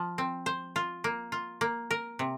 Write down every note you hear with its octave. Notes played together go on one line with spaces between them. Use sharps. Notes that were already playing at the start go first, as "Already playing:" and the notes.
Already playing: F3
C4
C5
F4
A#3
F4
A#3
A#4
C3